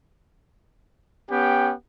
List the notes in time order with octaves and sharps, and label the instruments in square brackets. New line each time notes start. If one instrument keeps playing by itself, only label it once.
[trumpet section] B3 C#4 G4 G5